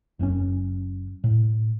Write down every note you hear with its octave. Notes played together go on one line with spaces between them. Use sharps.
F#1 F#2 B2 C#4
A2